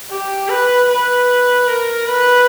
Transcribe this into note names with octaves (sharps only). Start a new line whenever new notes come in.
G4
B4
B4
A#4
B4